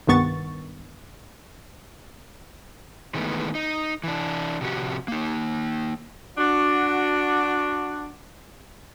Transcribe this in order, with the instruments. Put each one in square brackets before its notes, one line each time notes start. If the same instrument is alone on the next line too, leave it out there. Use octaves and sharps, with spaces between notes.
[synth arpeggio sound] C2 G2 D#3 B3 C#6 A6
[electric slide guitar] D#3 E3 G#3 A3 B3
D#4
E3 D4
C3 F3 F#4 G4
A#3 D#4
[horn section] D4 F#4